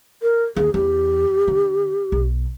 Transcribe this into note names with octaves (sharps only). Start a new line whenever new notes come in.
A#4
D#2 G#4
E2 G4
D3
B1